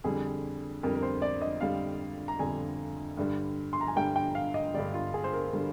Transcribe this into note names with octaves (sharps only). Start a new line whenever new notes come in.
F2 D3 G3 G#4
F2 D3 G3 A#4
A#4
C5
D5
D#5
F2 D3 G3 F5
A#5
F2 D3 G3 G#5
G2 D3 G3
C6
A#5
G#5
G2 D3 G3 G5
G5
F5
D#5
G2 D3 G3 D5
F4
G#4
C5
A#4
D3 G3